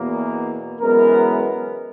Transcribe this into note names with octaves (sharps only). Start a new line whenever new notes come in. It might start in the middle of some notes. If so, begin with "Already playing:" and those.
Already playing: E2 B2 A#3
F#2 E3 G#3 B3 A#4